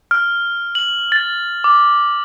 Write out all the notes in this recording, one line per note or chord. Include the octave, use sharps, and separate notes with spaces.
F6
F#7
A6
D6